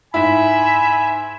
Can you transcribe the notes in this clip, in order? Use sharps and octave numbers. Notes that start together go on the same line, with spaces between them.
G#2 E4 E5 G#5 B5